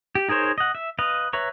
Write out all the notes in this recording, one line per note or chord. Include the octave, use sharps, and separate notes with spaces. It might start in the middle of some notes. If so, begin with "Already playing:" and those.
G4
D#4 G#4 A#4 C5 C#5
D#5 F#5
E5
B4 D#5 F5
B4 C#5 E5 A#5 C#6